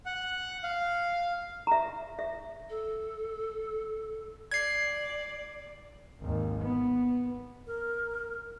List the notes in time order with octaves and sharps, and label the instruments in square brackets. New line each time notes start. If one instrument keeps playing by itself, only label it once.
[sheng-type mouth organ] F#5
F5
[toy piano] E5 A#5
E5
[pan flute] A4
[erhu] D5 [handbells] G#6 C7
[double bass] G#1 D#2
B3
[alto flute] A#4